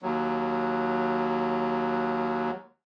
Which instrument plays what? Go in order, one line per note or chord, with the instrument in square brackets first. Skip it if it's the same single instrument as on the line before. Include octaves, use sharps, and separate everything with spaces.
[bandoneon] D#2 F#3